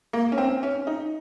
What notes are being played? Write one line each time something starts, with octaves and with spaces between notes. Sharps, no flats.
A#3
C#4
C4
C#4
D#4